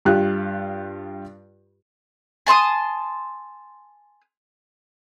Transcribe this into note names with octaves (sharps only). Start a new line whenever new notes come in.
G2 F4 G4 F#6
G#5 A5 C6 D#6